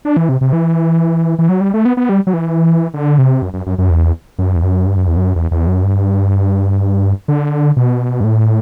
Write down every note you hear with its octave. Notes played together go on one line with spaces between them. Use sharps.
D4
E3
C3
C3
E3
E3
F#3
G3
A3
B3
B3
G3
F#3
E3
D3
C3
F#2
F#2
F#2
F#2
E2
F#2
E2
F#2
G2
F#2
E2
F#2
E2
E2
F#2
G2
D3
B2
G2
A2